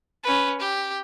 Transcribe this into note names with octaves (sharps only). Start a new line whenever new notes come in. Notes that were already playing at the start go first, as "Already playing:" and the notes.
C#4 B4
G4